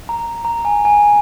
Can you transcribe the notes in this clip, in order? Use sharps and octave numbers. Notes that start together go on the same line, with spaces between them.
A#5
A#5
G#5
G#5